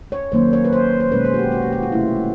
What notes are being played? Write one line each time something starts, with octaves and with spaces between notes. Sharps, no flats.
C#5
D#3 F#3 A#3 C#4 C5
C#5
B4
C5
C5
B2 G#3 C#4 B4
C5
F#4
G4
F#4
G4
F#4
F4
C3 F3 A3 C#4 E4